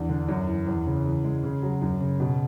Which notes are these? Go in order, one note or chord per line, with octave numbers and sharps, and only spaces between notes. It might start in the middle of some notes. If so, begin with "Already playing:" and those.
Already playing: E2 D4
D3
F#2
E3
E2
C#3
E3
G#3
C#3
F#3
F#2
C#3
B2